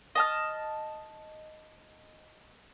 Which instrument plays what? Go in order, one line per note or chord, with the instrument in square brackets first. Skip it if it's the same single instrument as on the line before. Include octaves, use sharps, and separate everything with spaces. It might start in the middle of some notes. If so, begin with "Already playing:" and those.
[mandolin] D#5 A5 F6